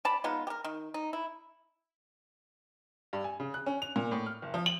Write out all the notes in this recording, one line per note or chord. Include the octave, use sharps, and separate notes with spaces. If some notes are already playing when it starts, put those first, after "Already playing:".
D5 A5 B5
G#3 B3 D#4 F4
G4 A#4
D#3
D#4
E4
G2
G#5
C#3
F#6
C#4
F7
A#2
A2
F6
F#1
F3
F#7